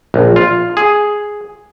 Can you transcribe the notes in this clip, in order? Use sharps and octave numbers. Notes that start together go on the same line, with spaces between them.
A#1
F4
G#4